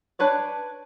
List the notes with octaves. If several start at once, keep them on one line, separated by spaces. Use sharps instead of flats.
D4 B4 C#5 D5